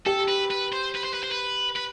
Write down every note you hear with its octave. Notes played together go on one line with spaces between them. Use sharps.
G4 A4
B4
B4
C5
B4
C5
B4
C5
B4
B4